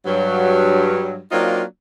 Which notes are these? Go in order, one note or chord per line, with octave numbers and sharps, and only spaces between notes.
G2 F#3
F#3 A#3 C4 D4 D#4 F4